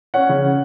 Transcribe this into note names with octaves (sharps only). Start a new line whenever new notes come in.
C#4 F#5
C#3